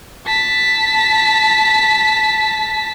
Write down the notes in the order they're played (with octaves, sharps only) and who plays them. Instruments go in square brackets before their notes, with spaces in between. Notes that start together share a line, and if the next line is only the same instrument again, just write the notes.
[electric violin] A5 B6